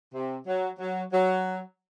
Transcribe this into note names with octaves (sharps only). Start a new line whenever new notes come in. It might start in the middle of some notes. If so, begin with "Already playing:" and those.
C3
F#3
F#3
F#3